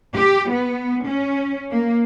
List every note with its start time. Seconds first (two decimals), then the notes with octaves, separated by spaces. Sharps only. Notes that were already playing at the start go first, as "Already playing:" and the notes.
0.17 G4
0.51 B3
1.07 C#4
1.71 A#3